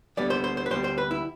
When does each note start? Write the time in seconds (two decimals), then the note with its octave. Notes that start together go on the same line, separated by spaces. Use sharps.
0.17 D2 D3 G3 B3 D5
0.30 C5
0.44 C5
0.57 C5
0.66 B4
0.71 D2 D3 G3 B3 C5
0.84 C5
0.98 B4
1.11 E4